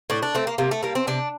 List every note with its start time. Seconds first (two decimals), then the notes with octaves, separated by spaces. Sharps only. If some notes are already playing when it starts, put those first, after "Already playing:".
0.10 A2 D4
0.23 D4
0.35 A3 C4
0.47 A#3
0.58 C3 A#3
0.71 A3
0.83 G3 A#3
0.95 C4
1.07 C3 D4